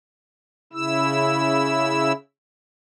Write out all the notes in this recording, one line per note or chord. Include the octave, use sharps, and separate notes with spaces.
C#3 E4 E6